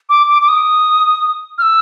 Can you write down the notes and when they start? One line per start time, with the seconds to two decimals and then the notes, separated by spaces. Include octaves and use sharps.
0.09 D6
0.29 D6
0.42 D6
0.49 D#6
1.58 F6
1.62 E6